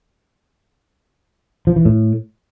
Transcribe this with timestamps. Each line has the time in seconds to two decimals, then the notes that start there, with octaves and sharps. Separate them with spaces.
1.67 F3
1.76 E3
1.85 A2